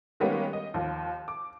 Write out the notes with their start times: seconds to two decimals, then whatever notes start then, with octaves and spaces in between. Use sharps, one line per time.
0.20 D#3 G3 G#3 A#3 B3 C#4
0.53 D#5
0.74 D#2 F3
1.28 D6